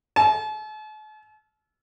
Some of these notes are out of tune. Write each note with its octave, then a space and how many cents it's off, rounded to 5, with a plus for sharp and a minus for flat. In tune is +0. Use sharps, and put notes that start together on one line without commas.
A5 -45